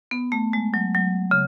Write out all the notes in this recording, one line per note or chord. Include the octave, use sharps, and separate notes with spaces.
B3
A3
G#3
F#3
F#3
C#3